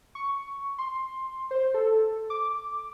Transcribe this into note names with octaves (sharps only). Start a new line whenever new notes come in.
C#6
C6
C5
A4
D6